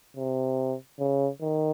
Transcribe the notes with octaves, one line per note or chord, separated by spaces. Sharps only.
C3
C#3
D#3